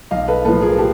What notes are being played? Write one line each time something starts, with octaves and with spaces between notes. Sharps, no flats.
B1 D#5 F5
A4 B4
A2 F3 A4 B4
G#4 A#4
G4 A4